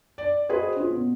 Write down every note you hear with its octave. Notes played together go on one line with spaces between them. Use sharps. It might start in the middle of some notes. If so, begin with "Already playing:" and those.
D5
F#4 G#4 B4 C5 D#5
C#4 F4
B2